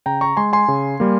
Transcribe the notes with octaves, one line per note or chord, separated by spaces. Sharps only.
C#3 G5 A#5
A#5 C#6
G#3 G#5 C6
G#5 C6
C#3
G3 A#3